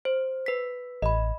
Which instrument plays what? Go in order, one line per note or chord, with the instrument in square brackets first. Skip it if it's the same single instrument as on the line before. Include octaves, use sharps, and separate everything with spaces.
[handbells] C5
B4 B6
[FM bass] A1 [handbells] D#5 B5